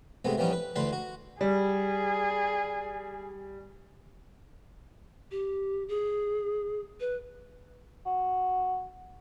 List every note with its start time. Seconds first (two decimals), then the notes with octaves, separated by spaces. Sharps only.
0.25 C3 G#3 A3 B3
0.38 E3 F3 G3 B3 C#4 D#4
0.53 B4
0.76 D2 D3 E3 B4 B5 C6
0.93 F#4
1.41 G3 G#4
5.31 G4
5.89 G#4
7.00 B4
8.06 F#4